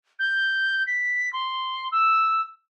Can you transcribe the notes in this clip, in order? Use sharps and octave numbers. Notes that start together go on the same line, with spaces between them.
G6
B6
C6
E6